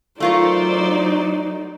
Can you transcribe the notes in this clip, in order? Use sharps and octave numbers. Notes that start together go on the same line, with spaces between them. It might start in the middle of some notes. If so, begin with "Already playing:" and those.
F#3 A3 D#4 F4 A#4 C5 D5